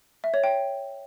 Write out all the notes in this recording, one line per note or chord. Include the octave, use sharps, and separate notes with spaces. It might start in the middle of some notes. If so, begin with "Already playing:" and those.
E5
C#5
G5